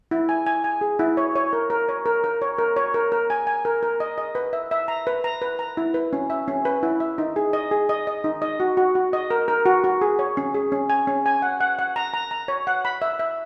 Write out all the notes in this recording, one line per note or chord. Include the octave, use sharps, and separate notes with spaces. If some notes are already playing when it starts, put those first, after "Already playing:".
E4
G#5
G#5
G#5
G#4
E4
C#5
C#5
A#4
A#4
C#5
A#4
A#4
C#5
A#4
C#5
A#4
A#4
G#5
G#5
A#4
A#4
D#5
D#5
B4
E5
E5
A#5
B4
A#5
B4
A#5
E4
B4
C#4
E5
C#4
B4
E4
E5
D#4
G#4
D#5
G#4
D#5
D#5
D#4
D#5
F#4
F#4
F#4
D#5
A#4
A#4
F#4
F#4
G#4
C#5
C#4
G#4
C#4
G#5
C#4
G#5
F#5
F#5
F#5
A#5
A#5
A#5
C#5
F#5
B5
E5
E5